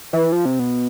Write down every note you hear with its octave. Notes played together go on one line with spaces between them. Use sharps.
E3
F3
C3
B2